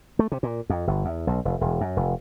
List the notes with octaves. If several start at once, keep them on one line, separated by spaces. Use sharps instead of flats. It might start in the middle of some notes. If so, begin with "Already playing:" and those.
A3
C3
A#2
F2
G1
E2
B1
F1
E1
F#2
F1